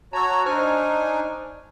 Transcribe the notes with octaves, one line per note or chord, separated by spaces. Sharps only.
F#4 C#5 A5 A#5 E6
D4 D#4 C5 G#5 C#6 F6